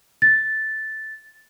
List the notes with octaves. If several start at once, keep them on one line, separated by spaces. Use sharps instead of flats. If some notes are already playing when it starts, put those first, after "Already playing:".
A6